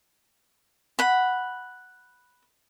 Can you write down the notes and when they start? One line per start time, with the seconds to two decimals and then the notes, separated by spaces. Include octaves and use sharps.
0.99 F#5 B5